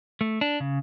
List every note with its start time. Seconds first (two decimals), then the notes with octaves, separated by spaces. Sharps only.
0.21 A3
0.41 D4
0.60 C#3